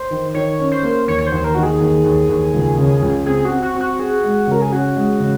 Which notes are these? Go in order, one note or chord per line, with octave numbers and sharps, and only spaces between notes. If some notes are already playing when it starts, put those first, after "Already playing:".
Already playing: C5
D#3
D#3 C#5
C#4
C5
A#3
D#2 C#5
C#5
C5
D#2
A#4
D#3 F#4
G#4
D#2
D#2
D#2
C#2
C#3
C#2
C4 G#4
F#4
C4
F#4
C4
F#4
G#4
G#3
C#3 A#4
G#4
C#4 F#4
G#3
C#3